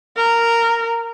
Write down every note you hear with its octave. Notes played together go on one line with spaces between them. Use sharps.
A#4